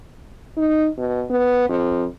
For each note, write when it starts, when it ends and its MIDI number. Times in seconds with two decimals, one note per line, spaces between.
0.57 0.88 63
0.98 1.25 47
1.30 1.67 59
1.69 2.06 41